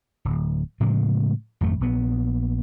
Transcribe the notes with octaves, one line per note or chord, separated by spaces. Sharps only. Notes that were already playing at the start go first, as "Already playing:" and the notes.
D1
A2 C#3 F3 G#3
G#1 F2 A3
A#1 B3